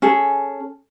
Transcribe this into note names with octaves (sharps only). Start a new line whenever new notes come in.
C#4 G#4 A4